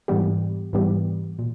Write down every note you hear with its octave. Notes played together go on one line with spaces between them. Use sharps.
G#2 E3 G3 B3 G4
G#2 E3 G3 B3 G4
A#2